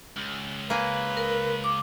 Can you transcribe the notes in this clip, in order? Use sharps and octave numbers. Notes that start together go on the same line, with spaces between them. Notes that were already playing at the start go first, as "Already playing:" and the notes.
C#2
A#3 B4 G#5
A#4
D6